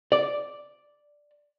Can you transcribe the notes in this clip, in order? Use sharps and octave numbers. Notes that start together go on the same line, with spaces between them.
D5